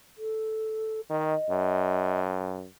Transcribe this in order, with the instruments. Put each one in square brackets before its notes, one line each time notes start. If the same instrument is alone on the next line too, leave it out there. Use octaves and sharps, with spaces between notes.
[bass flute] A4
[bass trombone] D#3 [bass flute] D#5
[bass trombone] F#2